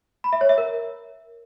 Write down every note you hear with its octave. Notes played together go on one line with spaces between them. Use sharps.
B5
E5
C#5
E5
A#4